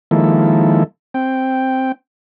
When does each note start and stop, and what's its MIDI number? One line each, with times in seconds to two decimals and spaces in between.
0.11 0.84 51
0.11 0.84 53
0.11 0.84 56
0.11 0.84 58
0.11 0.84 64
0.11 0.84 69
1.14 1.92 60
1.14 1.92 79